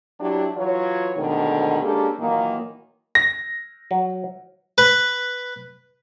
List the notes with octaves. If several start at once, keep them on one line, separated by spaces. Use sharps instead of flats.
F#3 G3 D4 E4 G4
E3 F#3 F4 C#5
D2 G#2 B2 D3 D#3
G#3 A#3 C#4 D4 G4 A4
A#2 D#3 E3 F#3 A#3
A#6
F#3
B4